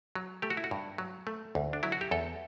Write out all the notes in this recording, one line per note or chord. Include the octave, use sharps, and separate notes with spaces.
F#3
A3 G4
F#4
E4
F#4
G2
F#3
A3
D2
D4
F#3 E4
F#4
G4
E2 A4